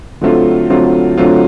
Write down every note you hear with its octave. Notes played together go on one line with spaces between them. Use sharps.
D3 F#3 A3 C4 F4
D3 F#3 A3 C4 F4
D3 F#3 A3 C4 F4